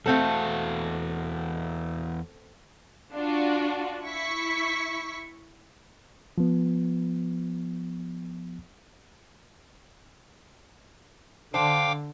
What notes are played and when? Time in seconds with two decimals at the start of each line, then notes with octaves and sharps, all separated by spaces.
0.06 E2 A3 C4 F#4 A4 F5
3.12 D4 F4 F#4
4.03 E4 C#6 B6
6.38 F3 B3
11.54 D3 D4 C5 F5 G5 D6